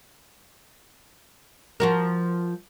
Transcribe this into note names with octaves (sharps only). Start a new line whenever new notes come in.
F3 F#4 A#4